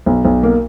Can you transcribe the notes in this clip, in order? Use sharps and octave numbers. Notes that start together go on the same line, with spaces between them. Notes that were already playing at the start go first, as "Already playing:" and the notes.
B1
B1
A#3